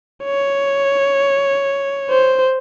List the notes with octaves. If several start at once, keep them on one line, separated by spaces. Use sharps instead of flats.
C#5
C5